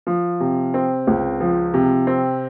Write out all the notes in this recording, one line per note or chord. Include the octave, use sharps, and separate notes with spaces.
F3
C3
C4
C#2
F3
C3
C4